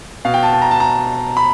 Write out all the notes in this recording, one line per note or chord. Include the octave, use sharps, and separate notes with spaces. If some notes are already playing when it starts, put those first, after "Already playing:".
B2 F5
G5
A5
A5
A#5
A5
A#5
B5